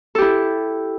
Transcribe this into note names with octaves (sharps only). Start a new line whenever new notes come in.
E4 G4 A4